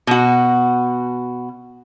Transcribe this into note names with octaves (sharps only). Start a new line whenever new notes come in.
B2 F#4